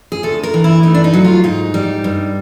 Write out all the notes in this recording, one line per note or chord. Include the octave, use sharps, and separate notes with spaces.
G#4
D2 A4
A#4
E3
E4
A3 D#4
D4
D#4
F#3
F4
G#2 D#4
G3
G2